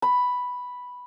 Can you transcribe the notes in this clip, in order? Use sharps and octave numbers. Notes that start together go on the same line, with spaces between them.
B5